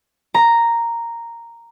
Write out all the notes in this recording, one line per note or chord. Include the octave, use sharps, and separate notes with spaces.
A#5